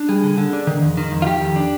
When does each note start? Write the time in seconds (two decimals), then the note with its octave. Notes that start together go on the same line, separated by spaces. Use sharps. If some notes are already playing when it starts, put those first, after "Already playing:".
Already playing: D4
0.09 G3 G#4
0.23 D3
0.38 D3
0.53 D4
0.67 D#3
0.82 F2
0.97 D#3
1.12 F2
1.22 F4
1.27 D#3 G4
1.41 F2
1.56 D4